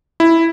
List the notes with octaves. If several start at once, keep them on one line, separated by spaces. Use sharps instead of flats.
E4